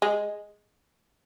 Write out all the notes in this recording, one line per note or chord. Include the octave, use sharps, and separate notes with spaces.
G#3